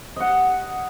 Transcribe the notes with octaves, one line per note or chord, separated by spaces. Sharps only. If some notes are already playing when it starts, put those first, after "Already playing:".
D#5 F#5